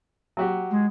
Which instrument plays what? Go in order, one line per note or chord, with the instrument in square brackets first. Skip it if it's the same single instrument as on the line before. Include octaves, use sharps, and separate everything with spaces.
[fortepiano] F#3 F#4 G4
[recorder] G#3